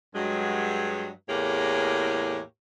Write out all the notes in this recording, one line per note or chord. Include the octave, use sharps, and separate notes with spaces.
G2 F#3 G#3
E2 A2 A#3 G4 G#4 C#5